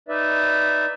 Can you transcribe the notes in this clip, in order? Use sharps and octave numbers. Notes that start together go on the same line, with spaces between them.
D#4 B4 D5 E5